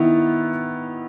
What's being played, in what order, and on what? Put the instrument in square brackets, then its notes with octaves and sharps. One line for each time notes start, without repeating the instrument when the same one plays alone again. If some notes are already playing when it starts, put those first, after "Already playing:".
Already playing: [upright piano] D#3 B3 E4